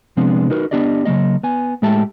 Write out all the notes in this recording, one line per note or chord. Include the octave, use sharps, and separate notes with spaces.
C3 F3 G#3 B3 C4 D4
D#4 F#4 A#4 B4
B3 D4 G4 D5 D#5
C#3 F#3 A#3 D#5
B3 G#5
A2 G#3 A3 G4 E5 A5